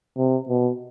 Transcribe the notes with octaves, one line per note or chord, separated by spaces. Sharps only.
C3
B2